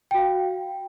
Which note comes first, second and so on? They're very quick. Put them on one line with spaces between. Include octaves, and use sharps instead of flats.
G5 F#4 F5